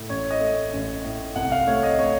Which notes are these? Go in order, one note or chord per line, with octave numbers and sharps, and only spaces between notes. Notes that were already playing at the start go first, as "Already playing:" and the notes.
Already playing: A2
A1 C#5
D#5
A3
A1
A2
C2 F#5
F5
A3 C#5
D#5
A3 C#5